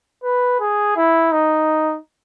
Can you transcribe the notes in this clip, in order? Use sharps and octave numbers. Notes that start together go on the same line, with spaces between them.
B4
G#4
E4
D#4